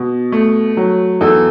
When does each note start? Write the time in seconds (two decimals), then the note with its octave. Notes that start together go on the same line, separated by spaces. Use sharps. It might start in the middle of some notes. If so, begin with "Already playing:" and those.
Already playing: B2
0.32 A3
0.77 F#3
1.21 E2 A4